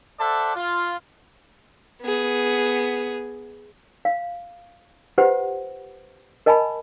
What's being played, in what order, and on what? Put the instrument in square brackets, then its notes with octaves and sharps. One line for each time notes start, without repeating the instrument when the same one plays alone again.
[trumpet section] A4 C5 D5 E5 F#5 A5
F4
[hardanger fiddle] B3 G#4
[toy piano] F5
F4 G4 B4 C5 F#5
A#4 D#5 G#5 A5 B5